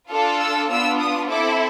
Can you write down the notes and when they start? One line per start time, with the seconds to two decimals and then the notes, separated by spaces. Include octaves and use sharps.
0.11 D4 F4 A4
0.41 E6
0.70 B3 D4 F4 E6
1.00 D#6
1.29 C4 E4 A4 D6